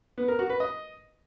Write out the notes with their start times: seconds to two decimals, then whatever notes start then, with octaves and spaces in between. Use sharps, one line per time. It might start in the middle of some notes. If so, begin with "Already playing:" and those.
0.18 B3
0.28 A#4
0.39 F#4
0.49 B4
0.60 D#5